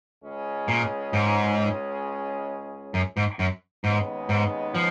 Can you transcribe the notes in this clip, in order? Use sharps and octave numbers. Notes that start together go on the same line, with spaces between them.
C#2 C#3 G#3 C#4 G#4
A#2
G#2
F#2
G#2
F#2
D#2 G#2 C#3 G#3 B3 D#4
G#2
F3